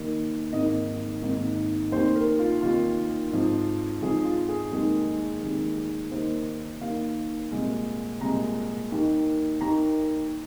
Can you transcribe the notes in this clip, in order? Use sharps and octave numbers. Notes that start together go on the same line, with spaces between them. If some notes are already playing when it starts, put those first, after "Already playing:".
Already playing: D#2 D#3 A#3
G#1 G#2 D#3 A#3 D#5
G#1 G#2 D#3 A#3
F1 D#2 D#3 C5
A#4
F4
F1 D#2 D#3 F4
G#1 G#2 F3
G#1 G#2 F3 G#4
F4
G#4
F1 D#2 D#3 G#3 G#4
F1 D#2 D#3 G#3
D#2 D#3 A#3 C5
D#2 D#3 A#3 F5
C2 A#2 G#3
C2 A#2 G#3 A#5
D#2 D#3 A#3
D#2 D#3 A#3 A#5